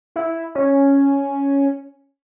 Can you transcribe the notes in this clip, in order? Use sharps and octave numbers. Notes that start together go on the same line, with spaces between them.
E4
C#4